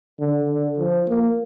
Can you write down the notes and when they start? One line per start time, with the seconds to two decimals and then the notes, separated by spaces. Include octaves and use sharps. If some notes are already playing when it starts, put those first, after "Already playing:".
0.20 D3
0.50 D3
0.79 F3
1.08 A#3